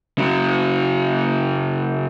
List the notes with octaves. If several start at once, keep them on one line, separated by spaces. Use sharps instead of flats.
C#3 F#3